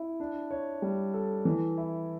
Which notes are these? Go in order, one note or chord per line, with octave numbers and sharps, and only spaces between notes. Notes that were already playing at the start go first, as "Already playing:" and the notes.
Already playing: E4
D4
C#5
G3
A4
E3
E4